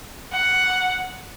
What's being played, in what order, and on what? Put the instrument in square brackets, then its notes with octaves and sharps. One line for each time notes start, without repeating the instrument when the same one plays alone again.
[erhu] F#5